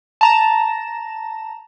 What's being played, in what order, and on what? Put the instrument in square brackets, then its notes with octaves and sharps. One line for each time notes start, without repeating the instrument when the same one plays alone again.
[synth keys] A5 A#5 E7